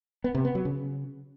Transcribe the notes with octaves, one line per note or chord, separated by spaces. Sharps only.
B3
C3
B3
F#3
C#3